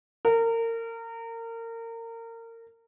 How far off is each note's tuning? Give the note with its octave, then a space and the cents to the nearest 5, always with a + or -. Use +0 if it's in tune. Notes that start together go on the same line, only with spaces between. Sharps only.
A#4 -30